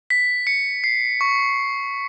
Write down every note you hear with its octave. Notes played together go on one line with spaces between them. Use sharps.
B6
C#7
C7
C#6